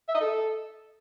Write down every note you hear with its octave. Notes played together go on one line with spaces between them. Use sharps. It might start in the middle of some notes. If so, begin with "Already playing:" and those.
E5
D#5
A4